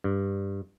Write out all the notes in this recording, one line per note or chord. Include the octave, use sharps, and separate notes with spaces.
G2